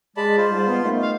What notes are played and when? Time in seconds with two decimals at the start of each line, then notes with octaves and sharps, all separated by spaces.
0.17 G#3 D5 A5 B5
0.37 F4 C5
0.51 G#2 G3
0.67 B3
0.84 D#3 A3
1.02 F5